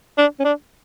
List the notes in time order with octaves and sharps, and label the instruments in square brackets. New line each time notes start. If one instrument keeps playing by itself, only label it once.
[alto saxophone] D4
C#4
D4